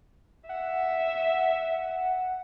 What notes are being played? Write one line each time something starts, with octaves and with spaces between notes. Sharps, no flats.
E5 F#5